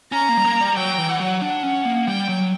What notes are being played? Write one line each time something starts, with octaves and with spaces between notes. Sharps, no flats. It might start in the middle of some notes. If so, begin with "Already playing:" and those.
C#4 A#5
A#3
G3
A#3
G3
F#3 G5
E3
F#5
F#3
D4 F#5
C#4
A#3
G3 G5
F#3